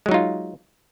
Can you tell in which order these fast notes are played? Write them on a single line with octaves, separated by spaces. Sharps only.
G#3 F#3 D#4 F4